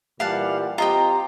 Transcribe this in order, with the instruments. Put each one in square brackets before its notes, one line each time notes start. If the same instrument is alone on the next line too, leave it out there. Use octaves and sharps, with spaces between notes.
[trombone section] A#2 E3 G3 [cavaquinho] F5 F#5 A5
[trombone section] C4 G4 [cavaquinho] F4 D#5 G5 [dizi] A#5